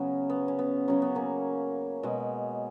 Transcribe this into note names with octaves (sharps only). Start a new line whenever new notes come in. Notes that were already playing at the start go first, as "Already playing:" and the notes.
Already playing: C#3 F#3 B3 C#4
B3
C#4
B3
C#3 F#3 C#4
B3
A#3 C#4
B2 G#3